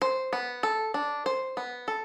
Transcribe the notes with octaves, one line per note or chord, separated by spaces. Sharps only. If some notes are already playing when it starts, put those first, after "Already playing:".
C5
B3
A4
D4
C5
B3
A4